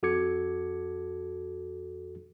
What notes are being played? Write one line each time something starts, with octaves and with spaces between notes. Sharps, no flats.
F2 F#4 A4 D6 G#6 C#7